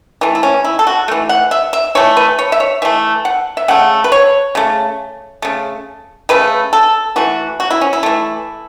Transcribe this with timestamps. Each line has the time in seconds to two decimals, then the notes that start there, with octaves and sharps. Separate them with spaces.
0.21 E3 A3
0.35 E4
0.43 C#4
0.64 E4
0.79 A4
0.87 F#4
1.08 E3 A3
1.29 F#5
1.51 E5
1.73 E5
1.95 E3 A3 C#5
2.17 B4
2.39 C#5
2.52 E5
2.60 C#5
2.82 E3 A3 E5
3.25 F#5
3.57 E5
3.68 C#3 A3 F#5
4.04 B4
4.12 C#5
4.55 C#3 A3
5.42 C#3 A3
6.29 C#3 A3 B4
6.73 A4
7.16 E3 A3 F#4
7.60 F#4
7.70 E4
7.81 C#4
7.93 E4
8.03 E3 A3